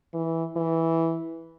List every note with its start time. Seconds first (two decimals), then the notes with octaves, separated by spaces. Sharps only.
0.14 E3
0.56 E3